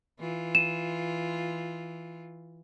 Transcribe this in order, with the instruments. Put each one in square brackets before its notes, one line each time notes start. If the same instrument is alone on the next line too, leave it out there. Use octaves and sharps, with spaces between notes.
[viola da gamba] E3 F4
[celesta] D#7 E7